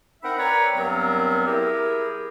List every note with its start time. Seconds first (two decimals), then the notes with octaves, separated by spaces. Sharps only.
0.23 C4 D#4 A#4 E5 F#5 B5
0.38 A#4 B4 C#5 D5 G5 A#5
0.76 G2 F#3 B3 C4 A#4
1.46 E4 G4 G#4 A#4